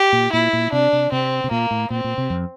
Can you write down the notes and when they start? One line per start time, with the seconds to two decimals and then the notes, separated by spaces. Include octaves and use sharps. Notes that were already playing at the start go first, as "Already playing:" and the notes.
Already playing: G4
0.13 A#2
0.33 A#2 E4
0.53 A#2
0.72 C3 D4
0.93 C3
1.12 C3 C4
1.44 C3
1.51 A#2 A#3
1.71 A2
1.90 A#2 C4
2.04 A#2
2.18 C3
2.30 F2